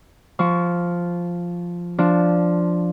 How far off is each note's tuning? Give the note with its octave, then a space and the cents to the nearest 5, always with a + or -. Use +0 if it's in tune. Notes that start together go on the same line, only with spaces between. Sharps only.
F3 +0 C#6 +20
F3 +0 D4 +0